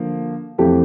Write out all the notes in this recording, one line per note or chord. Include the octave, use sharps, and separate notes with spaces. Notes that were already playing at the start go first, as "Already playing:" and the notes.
Already playing: D3 F3 A#3
F2 E3 A3 C4 G4